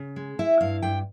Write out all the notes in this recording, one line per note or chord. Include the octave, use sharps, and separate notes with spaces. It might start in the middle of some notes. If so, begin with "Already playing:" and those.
Already playing: C#3
G#3
E4 E5
G2 F5
G2 G5